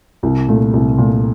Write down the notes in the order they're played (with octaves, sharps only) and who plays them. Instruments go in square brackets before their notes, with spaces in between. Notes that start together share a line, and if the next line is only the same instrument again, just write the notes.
[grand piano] C2
A#2 A3
C2
A#2 A3